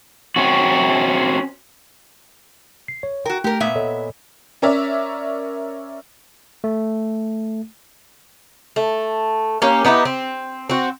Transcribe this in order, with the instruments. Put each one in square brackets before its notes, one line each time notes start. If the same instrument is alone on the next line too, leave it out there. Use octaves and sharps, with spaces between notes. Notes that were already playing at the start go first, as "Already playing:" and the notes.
[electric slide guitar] C4 C#4 F#4
[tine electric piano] C7
C#5
[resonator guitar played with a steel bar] F#4 A#4 [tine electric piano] G5
[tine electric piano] A3 [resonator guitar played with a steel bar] G4 A#4
[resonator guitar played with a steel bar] A#2 B3 E5
[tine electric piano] A4 C#5 D#5
[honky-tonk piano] C#4 A#4 C#5 D5 E5
[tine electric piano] A3
[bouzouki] A3
A#3 C#4 G4
B3 D#4 E4 G4
C4
C4 F#4